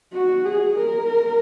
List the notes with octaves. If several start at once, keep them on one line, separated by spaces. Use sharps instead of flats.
F#4
G#4
A#4